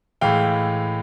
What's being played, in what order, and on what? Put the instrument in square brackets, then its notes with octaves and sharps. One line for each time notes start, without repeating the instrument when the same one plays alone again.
[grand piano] A2 E3 G#3 F5 G5